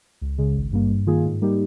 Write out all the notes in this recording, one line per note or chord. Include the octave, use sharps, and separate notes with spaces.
C#2
C#3 G#3
G#1
G2 G3 A#3
G2
D#3 A#3 F4 G#4
G#2
G3 A#3 D#4 G4